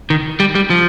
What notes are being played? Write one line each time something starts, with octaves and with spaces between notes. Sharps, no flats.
D#3
G3
G3
F3